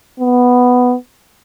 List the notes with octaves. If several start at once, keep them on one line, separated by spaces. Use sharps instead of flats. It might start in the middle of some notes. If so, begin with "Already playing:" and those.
B3